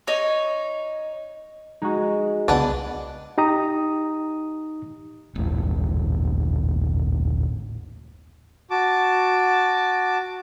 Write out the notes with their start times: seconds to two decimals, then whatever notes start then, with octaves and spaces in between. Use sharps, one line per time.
0.08 D#4 C#5
1.82 G#3 D#4 F#4
2.48 C2 C#3 B3 D4 B4 F#5
3.38 D#4 G4 A#5 D#6
5.35 D#1 A1 A2
8.71 F#4 A5 D6